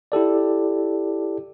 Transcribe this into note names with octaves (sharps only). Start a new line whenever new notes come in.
E4 G4 A4 D5